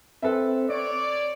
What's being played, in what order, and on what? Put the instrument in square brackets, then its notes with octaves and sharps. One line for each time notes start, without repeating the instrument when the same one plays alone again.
[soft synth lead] C4 [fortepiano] A4 B4 E5
[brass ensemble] C#5 D5 [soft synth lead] D7